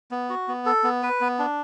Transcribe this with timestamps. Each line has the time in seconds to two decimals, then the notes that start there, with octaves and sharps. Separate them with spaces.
0.11 B3
0.30 F#4
0.48 B3
0.66 A4
0.84 B3
1.03 B4
1.21 B3
1.39 D4